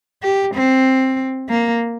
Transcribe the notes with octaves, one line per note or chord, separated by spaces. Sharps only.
G4
C4
A#3